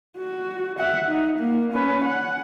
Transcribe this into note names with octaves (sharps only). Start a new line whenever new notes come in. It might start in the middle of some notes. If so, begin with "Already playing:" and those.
F#4
E5 F#5
D#4
A#3
C#4 B4
F#5